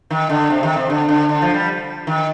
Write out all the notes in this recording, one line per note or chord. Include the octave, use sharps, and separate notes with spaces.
D#3
D3
C3
D#3
C3
D3
D3
D3
F3
G3
D#3